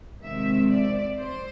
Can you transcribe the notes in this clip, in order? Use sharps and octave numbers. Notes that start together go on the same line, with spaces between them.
C3 D#3 G#3 C4 E5
D5
C5